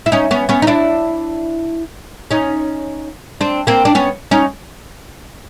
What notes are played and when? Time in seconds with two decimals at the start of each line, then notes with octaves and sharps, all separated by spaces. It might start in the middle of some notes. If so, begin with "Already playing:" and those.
0.06 E4
0.12 C#4 D#4
0.31 B3 C#4
0.49 B3 C#4
0.62 D#4
0.67 D4 E4
2.31 C#4 D#4
3.41 C4 D4
3.67 A#3 C4
3.85 D4
3.95 B3 C#4
4.31 C#4 D#4